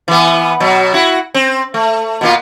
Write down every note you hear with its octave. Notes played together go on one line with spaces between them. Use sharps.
E3 B3
B2 F#3
E4 F#4
C4
A3
B2 A#3 F4